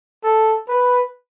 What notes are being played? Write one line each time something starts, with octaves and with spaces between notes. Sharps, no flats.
A4
B4